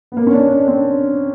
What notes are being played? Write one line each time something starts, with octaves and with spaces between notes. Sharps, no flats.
B3
A#3
C#4
D4
D4
C4